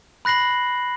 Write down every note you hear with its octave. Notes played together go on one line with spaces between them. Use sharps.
B5 F#6 A#6 C7 F#7